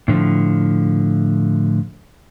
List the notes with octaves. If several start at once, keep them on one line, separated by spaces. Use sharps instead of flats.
A2 D3 F3